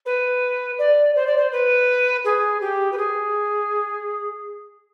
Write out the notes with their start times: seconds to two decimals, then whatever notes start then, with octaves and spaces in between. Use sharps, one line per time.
0.05 B4
0.78 D5
1.15 C5
1.26 D5
1.37 C5
1.51 B4
2.24 G#4
2.60 G4
2.92 B4
2.97 G#4